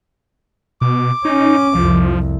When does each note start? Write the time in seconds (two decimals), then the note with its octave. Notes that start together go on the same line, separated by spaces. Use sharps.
0.81 B2 D6
1.25 C#4 D#4
1.75 C2 F2 F3